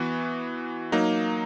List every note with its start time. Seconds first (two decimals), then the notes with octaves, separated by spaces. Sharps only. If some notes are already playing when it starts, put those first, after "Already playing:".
Already playing: E3 B3 F#4
0.92 F#3 A#3 D#4